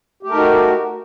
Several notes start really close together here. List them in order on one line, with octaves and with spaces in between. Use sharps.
G4 A3 A#4 D#4 F#4